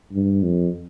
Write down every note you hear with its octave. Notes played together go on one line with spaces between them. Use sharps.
G2
F2